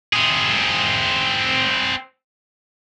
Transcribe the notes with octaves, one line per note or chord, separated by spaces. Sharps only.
C4 G#4